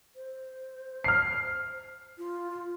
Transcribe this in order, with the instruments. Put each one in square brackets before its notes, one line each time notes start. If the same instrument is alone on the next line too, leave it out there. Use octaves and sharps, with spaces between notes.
[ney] C5
[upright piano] F6 C7
[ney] F4